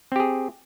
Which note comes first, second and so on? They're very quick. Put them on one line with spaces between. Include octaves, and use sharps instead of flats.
C4 G4 G#4